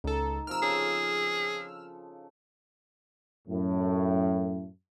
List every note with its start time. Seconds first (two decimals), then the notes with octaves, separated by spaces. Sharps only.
0.04 C#2 D#4 A4
0.47 C3 F3 A#4 E6 F6
0.63 C#3 G#4 A4 C#5
3.47 F#2 A2